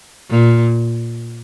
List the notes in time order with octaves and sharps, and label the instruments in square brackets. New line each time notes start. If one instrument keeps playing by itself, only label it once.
[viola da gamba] A#2